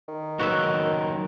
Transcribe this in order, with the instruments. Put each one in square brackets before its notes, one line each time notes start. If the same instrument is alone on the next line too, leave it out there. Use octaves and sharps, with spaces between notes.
[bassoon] D#3
[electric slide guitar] F#3 A#3 D#4 [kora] F#4 B4 E5